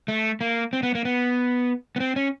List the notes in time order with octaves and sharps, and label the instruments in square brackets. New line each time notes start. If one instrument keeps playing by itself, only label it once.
[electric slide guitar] A3
A#3
C4
B3
A#3
B3
B3
C4
C#4